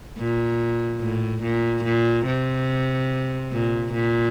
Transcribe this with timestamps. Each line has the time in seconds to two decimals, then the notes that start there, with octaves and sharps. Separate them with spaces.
0.18 A#2
1.01 A2
1.43 A#2
1.84 A#2
2.27 C3
3.52 A#2
3.93 A#2